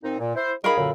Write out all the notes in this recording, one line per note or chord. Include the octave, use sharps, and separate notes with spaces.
A#2 C4 D#4
A#2
E4 C5
D#3 G#4 A#4 F5 B5
F#2 A#2 D3